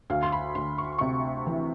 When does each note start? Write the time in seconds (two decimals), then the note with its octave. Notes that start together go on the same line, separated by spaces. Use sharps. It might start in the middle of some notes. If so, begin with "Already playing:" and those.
0.10 D2 F5
0.23 C6
0.32 B5
0.55 D2 C6
0.78 C#6
0.98 C3 C#6
1.47 E3